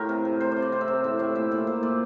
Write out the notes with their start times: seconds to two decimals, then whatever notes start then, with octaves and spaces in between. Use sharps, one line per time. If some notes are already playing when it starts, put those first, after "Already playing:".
Already playing: A2 F4 G4 A#4
0.09 C3
0.25 C3
0.40 C3 C5
0.51 C3 D5
0.62 D5
0.72 C3 C5
0.81 E5
0.88 C3 D5
1.04 A2 E5
1.19 A2 D5
1.35 A#2 E5
1.51 A#2 D5
1.67 A#2 C5
1.83 A#2 D5